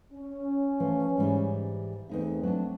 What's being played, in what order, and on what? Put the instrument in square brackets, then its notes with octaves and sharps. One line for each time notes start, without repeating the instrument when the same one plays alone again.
[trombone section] C#4
[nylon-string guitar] E3 F3 A3
G#2 E3 G3
[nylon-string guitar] E2 D#4 E5 [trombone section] A3 C4
[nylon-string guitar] F#3 D4